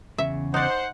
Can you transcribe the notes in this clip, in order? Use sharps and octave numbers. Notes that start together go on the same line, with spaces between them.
E2 C#3 E5
D#4 C5 D5 F#5